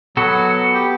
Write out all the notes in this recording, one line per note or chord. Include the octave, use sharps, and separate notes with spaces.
F#3 B3 F#4 A4
G4